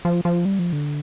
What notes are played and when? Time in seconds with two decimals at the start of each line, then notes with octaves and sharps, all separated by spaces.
0.05 F3
0.25 F3
0.45 G3
0.59 F3
0.72 D3